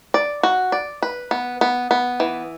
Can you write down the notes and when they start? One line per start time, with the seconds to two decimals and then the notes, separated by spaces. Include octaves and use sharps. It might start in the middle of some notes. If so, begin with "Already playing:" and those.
0.14 D5
0.43 F#4
0.72 D5
1.02 B4
1.31 B3
1.61 B3
1.91 B3
2.20 E3